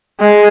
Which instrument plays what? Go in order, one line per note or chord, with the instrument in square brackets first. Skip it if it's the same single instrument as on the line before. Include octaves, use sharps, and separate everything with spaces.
[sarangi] G#3